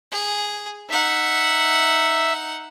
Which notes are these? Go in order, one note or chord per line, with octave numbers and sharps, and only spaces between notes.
G#4
D#4 E5 F#5